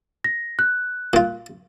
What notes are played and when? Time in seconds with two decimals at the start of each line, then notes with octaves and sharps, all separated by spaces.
0.24 A#6
0.59 F#6
1.13 A#2 F4